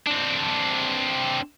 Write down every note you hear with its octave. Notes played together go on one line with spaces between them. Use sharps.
C4 D4